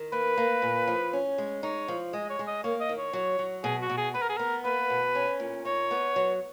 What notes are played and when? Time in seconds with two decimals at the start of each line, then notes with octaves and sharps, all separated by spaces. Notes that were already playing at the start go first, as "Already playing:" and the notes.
Already playing: D#3
0.12 A#3 B4
0.37 A#3
0.62 A#2
0.88 F3
1.13 C#4
1.38 G#3
1.63 D#4 C#5
1.88 F3
2.13 G#3 D#5
2.30 C#5
2.39 G#3
2.47 D#5
2.64 A#3 C#5
2.80 D#5
2.89 D#3
2.97 C#5
3.13 F#3
3.39 F#3
3.64 B2 G#4
3.81 F#4
3.90 B2
3.97 G#4
4.14 B3 B4
4.22 A#4
4.29 G#4
4.37 B3 A#4
4.64 A#3 B4
4.90 B2
5.15 C#4
5.40 A#2
5.65 D#4 C#5
5.91 B3
6.16 F#3